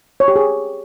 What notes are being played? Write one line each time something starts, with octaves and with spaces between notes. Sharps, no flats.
C#5
G4
G#4